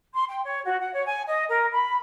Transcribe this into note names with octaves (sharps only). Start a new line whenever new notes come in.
C6
G5
C#5
F#4
F#5
C#5
G#5
D#5
A#4
B5